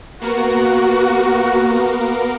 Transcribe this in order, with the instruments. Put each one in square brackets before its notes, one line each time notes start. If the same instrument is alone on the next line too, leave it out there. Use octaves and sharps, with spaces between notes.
[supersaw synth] A#3 B3 A#4 [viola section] F#4